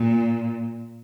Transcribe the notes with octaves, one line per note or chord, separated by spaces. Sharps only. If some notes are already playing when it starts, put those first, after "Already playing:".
Already playing: A#2